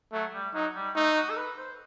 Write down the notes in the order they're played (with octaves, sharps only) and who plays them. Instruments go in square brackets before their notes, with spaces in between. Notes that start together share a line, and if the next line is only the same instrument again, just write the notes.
[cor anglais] F#3 [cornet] A3
[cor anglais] G3
[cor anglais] F#3 [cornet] D#4
[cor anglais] G3
[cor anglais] A3 [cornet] D#4
[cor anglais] F#4
A4
B4
C5